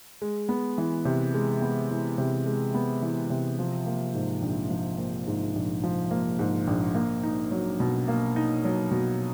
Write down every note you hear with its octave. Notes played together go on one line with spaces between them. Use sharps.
G#3
B3
E3
C3
G#3
B3
E3
C3
G#3
B3
E3
C3
F3
A#3
G#2
A#1
F3
A#3
G#2
A#1
F3
A#3
G#2
A#1
A#3
D#4
F#3
B2
A#3
D#4
F#3
B2